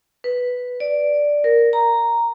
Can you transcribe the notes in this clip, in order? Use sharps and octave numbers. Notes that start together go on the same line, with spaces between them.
B4
D5
A#4
A#5